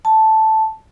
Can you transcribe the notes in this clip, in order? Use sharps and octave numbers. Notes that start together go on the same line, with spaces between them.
A5